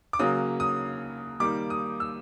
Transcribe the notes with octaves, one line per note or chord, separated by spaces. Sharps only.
D6
C#3 F#3 A#3 D#6
D#6
D#3 G3 A#3 D6
D#6
E6